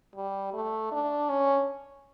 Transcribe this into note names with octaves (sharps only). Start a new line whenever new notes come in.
G3
A3
D4
C#4